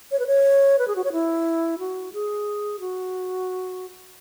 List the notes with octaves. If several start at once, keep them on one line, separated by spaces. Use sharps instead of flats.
C#5
B4
C#5
B4
G#4
F#4
C#5
E4
F#4
G#4
F#4